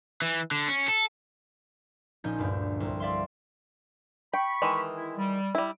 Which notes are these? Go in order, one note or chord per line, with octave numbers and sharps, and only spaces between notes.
E3
D3
C#4
A4
A#1 A#2 C#4 D#4 G6
D2 G2 D4
C2
D5 E5 F5 C6
G5 B5 C#6
D#3 E3 G#3
E4
G3
G3 E4